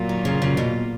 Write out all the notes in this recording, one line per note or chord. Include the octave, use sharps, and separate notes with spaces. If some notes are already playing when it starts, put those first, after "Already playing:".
Already playing: A#2 F#3 A#3 F4
D#3
C#3
C#3
B2